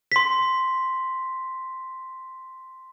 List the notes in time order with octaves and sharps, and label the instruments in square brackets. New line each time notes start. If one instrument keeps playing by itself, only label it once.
[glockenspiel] C6 B6